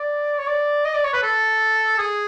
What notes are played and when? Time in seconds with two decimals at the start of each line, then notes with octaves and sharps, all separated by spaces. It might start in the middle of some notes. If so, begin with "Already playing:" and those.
Already playing: D5
0.38 C#5
0.47 D5
0.85 D#5
0.94 D5
1.04 C#5
1.13 B4
1.22 A4
1.98 G#4